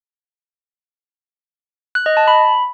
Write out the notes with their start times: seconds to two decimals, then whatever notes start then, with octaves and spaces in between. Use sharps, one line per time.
1.95 F#6
2.06 D#5
2.17 A5
2.28 B5